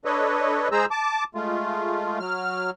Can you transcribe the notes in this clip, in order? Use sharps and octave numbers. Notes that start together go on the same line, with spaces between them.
D4 A4 B4 C#5 D#5
G#3 G#4 C5 A#5 E6
A5 D6
G#3 A3 F4
F#3 F6